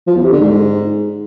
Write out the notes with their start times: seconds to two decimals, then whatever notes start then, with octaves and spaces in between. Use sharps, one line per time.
0.07 F3
0.16 E2
0.24 C3
0.32 D3
0.41 G#2